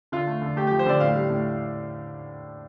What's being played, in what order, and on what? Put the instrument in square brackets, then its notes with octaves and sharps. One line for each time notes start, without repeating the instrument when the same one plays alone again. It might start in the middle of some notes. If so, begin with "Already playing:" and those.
[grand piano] D3 F4
A3
D3
A3 G4
F3 G4
C5
D3 D5
A2 F5
G3
A2